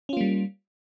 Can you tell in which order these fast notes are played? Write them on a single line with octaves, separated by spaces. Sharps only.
C#4 F4 A#3 G3